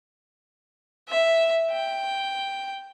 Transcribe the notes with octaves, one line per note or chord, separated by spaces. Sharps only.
E5
G5